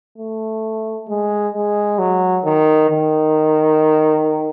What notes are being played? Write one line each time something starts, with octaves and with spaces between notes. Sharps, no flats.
A3
G#3
G#3
F#3
D#3
D#3